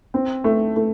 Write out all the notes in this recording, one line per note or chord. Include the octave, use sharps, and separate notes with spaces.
C4
A3
A3